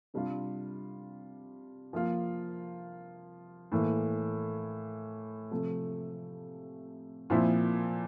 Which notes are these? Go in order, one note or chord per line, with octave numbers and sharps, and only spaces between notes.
C3 G3 D4 F4
F3 A#3 F4
A2 E3 A#3
C3 F3 A3
A#2 F3 C4 E4